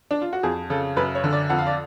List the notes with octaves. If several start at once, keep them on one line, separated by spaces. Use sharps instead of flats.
D4
F4
F#4
F2 G#4
C#3 A4
F#2 B4
C#5
D3
D5
F2 F#5
F5
D5